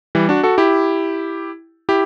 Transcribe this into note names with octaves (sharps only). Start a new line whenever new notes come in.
E3 G3
D4 F#4
F#4 A4
E4 G4
E4 G4